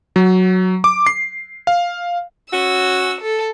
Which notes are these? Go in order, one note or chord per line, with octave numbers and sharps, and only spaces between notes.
F#3
D6
C7
F5
C#4 F#4 E6
A4